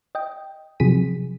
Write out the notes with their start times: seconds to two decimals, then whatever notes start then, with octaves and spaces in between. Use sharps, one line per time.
0.15 D#5 G5
0.80 C3 F3 F#3 G#4 B6 D#7